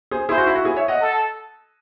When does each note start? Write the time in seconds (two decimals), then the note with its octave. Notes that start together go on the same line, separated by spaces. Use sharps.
0.11 G#4 C5
0.29 E4 G#4 C5
0.38 F#4
0.47 E4
0.55 F#4
0.64 E4 G#4
0.77 C#5 E5
0.88 D#5 F#5
1.01 A4